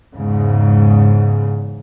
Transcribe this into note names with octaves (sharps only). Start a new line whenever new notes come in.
E2 G#2 C#3